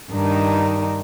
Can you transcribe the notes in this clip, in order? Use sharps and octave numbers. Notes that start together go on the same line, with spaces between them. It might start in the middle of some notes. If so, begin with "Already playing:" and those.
G2 D#3 D4 D#4